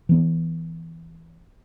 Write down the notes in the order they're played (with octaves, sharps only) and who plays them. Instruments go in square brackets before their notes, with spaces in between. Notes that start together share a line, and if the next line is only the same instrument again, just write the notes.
[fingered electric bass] E3 B3